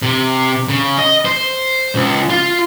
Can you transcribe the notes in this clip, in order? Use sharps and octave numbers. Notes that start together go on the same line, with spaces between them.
C3
C#3
D#5
C5
C#2
F4